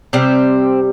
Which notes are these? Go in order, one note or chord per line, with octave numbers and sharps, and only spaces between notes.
C3 G3 C4